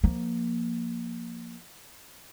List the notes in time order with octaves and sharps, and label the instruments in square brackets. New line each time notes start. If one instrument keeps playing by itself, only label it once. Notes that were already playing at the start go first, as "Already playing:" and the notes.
[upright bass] F3 A#3